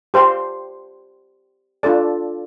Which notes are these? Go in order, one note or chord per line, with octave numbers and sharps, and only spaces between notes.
G4 C5 G5 C6
D4 F4 A4 D5 A5